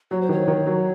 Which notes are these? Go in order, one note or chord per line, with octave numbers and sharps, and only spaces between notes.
F#3 C#5
C5
D#3 C#5
D#3
F#3